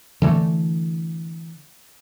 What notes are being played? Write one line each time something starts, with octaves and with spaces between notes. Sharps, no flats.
D3 E3 G#3 A3